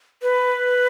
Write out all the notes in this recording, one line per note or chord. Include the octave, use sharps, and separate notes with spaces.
B4